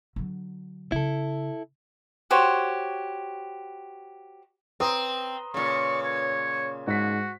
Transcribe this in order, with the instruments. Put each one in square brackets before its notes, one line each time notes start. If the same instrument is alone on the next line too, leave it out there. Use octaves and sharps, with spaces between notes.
[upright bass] D3 F#3
[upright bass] C#3 [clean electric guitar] E4 A4
[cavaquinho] F#4 G4 C5 C#5
[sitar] C4 [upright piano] B4 A#5 D#6
[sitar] A#2 C#3 [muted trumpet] C#6
[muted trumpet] C#5
[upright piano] G#2 B6 [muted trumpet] F#4